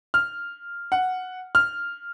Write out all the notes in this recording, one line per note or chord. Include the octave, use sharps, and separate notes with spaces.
F6
F#5
F6